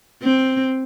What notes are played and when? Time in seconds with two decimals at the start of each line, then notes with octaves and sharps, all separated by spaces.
0.23 C4